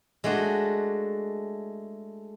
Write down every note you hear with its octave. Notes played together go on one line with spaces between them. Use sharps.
G#3 A3 D4 F#4